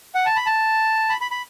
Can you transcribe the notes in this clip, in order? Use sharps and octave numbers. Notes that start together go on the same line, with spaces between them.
F#5
A5
B5
A5
B5
B5
B5